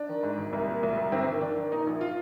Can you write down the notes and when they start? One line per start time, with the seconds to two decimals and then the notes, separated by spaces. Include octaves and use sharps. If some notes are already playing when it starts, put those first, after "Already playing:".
Already playing: D4
0.09 D#3
0.23 G#2
0.38 G#1
0.53 C2
0.68 A#2
0.83 C2
0.97 C2
1.12 G1 C4
1.27 D#3
1.41 D#3 D4
1.56 D#3
1.72 A#2 D#4
1.87 A#1
2.01 F4